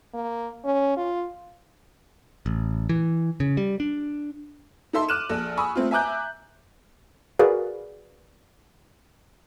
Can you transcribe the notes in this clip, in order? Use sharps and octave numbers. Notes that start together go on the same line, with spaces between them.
A#3
C#4
F4
A1
E3
C#3
G3
D4
D#4 E4 A4 E5 C6
D6 F6 F#6 D#7 E7
A#1 A4
G#5 B5 C#6 D#6 E6
A3 C4 F4
E5 G#5 A#5 D6 F#6 G6
F#4 G#4 A#4 B4 D5 F5